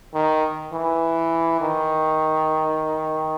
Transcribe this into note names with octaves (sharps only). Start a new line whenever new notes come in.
D#3
E3
D#3